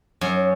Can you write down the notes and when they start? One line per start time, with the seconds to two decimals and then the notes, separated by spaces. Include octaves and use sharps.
0.21 F#2